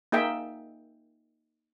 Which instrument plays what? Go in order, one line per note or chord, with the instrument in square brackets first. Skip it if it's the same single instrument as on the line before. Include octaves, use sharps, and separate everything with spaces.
[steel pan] A#3 D#4 G#4 E5 G5